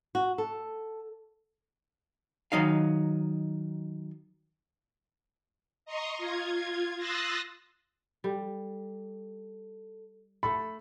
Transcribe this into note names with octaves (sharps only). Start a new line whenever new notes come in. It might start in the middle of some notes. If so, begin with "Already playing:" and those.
F#4
A4
D#3 F#3 D#4 F5
D#5 A#5 C6 C#6 D#6
F4 G#6
C6 D#6 E6 F#6 A6 A#6
G3 A4
A3 A4 B5